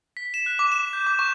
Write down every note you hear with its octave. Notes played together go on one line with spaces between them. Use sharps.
B6
E7
F#6
D6
E7
G6
D6
C#6